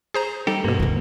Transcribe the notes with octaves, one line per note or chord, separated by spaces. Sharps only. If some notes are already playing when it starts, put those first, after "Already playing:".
G#4 C5 A#5
G3 D#4 G4 A4
G2 B2 A#3
D2 C#3